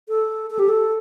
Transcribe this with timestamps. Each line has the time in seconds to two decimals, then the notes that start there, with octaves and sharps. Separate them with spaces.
0.09 A4
0.50 A4
0.59 G4
0.69 A4